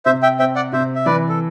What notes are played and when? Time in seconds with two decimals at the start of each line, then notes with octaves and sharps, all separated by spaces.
0.06 C3 C5 E5
0.23 E5 G5
0.39 C4 E5 G5
0.56 D5 F#5
0.72 C3 C5 E5
0.96 E5
1.05 E3 B4 D5
1.29 A4